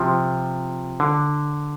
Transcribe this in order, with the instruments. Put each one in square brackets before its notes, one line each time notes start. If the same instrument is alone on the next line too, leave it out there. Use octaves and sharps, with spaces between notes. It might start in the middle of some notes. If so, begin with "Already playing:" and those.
Already playing: [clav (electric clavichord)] C3 F3
D3